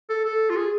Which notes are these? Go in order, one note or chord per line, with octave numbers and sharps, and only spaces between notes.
A4
A4
F4
G#4